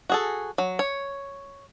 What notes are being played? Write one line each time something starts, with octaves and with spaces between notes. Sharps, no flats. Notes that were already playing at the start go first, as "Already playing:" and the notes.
F#4 G#4 A4
F#3
C#5